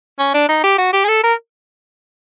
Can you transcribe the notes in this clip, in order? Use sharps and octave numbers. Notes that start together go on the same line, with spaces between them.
C#4
D4
D#4
G4
F#4
G4
G#4
A4
A#4